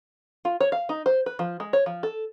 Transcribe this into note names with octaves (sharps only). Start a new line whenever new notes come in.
F4
C#5
F5
D#4
C5
B4
F3
G#3
C#5
F3
A4